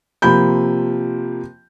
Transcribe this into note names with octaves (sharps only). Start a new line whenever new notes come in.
C3 F3 A#3 B5 G6